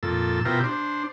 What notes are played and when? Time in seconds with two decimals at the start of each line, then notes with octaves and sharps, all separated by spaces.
0.03 F2 A#2 A4 E6
0.45 B2 E4 F4 G4 A#4 C5
0.64 D4 C5